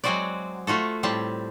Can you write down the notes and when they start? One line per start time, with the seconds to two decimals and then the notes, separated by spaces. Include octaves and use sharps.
0.04 F#3 G#3 C4 F#4 C5 D5
0.67 A3 F4 F#4 A4
1.03 A2 G3 C4 A5